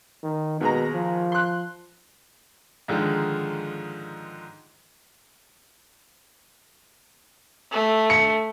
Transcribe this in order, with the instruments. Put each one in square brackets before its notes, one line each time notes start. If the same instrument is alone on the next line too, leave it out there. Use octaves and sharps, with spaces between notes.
[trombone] D#3
[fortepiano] D#2 G#3 A#5 [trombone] B2
[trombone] F3
[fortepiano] C6 F#6
[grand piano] G#2 D3 D#3 F3 G#3
[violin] A3
[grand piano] C#7